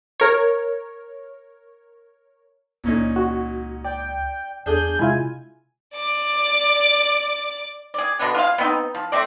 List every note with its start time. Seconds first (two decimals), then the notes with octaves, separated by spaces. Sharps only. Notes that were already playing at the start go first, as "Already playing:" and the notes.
0.20 A#4 C#5
2.84 C#2 A#2 C#4 D#4
3.16 F#4
3.85 D5 G5
4.66 E2 D4 G#4 G6
4.99 C3 G#3 E4 F4 G#5
5.95 D5 D6
7.94 G#4 D5
8.19 B2 D3 B3 D4
8.35 F4 G#4 E5 F5
8.58 B3 C4 D#4
8.95 F3
9.12 A3 C4 D5